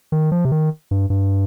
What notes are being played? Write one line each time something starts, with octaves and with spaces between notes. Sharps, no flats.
D#3
F3
C3
D#3
G2
G2